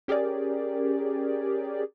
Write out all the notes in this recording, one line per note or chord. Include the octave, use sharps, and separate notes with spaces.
C#4 G4 G#4 A#4 D5